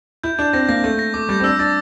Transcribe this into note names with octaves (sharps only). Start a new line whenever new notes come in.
E4 G6
D4 G6
C4 A#6
A#3 A#6
A3 G6
A#6
A3 D6
G3 G6
C4
D4 E6
D4 A6